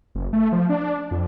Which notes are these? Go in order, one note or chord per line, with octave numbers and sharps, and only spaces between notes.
F#1
A3
F3
D4
F2